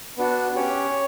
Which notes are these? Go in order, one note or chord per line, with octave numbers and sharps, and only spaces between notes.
B3 D4 F#4
C#4 G4 C#5